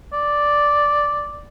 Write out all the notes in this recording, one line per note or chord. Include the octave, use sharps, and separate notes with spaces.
D5